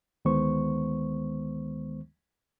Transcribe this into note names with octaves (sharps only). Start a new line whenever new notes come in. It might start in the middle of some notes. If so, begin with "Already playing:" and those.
D2 D#3 G#3 B3 C5 C#6